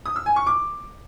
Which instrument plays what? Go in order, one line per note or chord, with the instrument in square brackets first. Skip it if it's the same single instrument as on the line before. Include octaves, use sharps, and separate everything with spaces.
[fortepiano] D#6
E6
G#5
C#6
D6